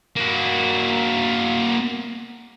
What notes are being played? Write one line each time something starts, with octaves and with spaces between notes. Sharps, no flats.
A#3 F#4